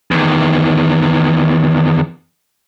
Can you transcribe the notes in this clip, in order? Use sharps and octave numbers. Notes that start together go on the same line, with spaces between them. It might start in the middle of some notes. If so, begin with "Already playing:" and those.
E2 D#3